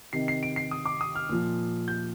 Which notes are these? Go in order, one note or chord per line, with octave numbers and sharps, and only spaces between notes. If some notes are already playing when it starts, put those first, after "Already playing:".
C3 D#3 C7
C7
D7
C7
D#6
D6
D#6
F6
A#2 F3
G6